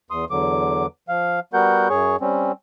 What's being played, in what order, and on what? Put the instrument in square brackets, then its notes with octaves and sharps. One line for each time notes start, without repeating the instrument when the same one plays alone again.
[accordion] E2 C6 D#6
E2 D3 F#3 D6
F3 F5
G3 B3 F#4 A#4 F#5 G6
F#2 G#4 C#5 C#6
G3 C4 C#4